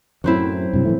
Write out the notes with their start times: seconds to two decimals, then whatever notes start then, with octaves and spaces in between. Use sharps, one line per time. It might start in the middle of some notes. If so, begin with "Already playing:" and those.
0.24 F#2 A2 F#3 C4 E4
0.73 G2 C3
0.85 A2 E3 A3